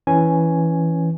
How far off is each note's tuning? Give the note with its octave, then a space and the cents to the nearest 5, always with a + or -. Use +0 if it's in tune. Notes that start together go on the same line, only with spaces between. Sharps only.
E3 +0 C#4 +0 G#5 +0